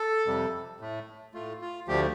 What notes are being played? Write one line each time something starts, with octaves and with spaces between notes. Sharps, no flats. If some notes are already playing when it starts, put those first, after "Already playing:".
Already playing: A4
F2 C3 G3
A2 A3
A2 A3 F4
F4
D2 D3 F3 A3 G4